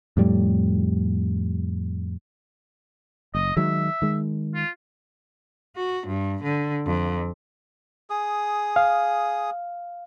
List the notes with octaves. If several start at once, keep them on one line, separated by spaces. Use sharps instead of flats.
F2 A2 G3
F#1 D#5
D#3 F#3 G#3 E5
D#3 G#3
F4
F#4
G2
D3
F2
G#4 D#6
F5